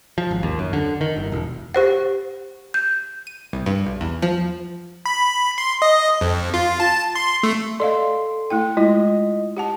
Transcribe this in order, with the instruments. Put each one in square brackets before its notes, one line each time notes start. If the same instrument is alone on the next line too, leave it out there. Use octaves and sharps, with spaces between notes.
[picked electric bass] F3
G#1
D#2
F#2
D3
D#3
G1
E1
[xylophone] G4 C5 F#5
G6
[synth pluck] D#7
C2
G2
B1
E2
F3
[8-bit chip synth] B5
C6
D#5
F2
F4
A5
C6
A3
[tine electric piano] A4 C6 [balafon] D5 D#5 F5
[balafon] A3 E4 G5
[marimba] G#3 E4 [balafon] F4 [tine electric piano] D#5
[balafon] G4 F#5 A5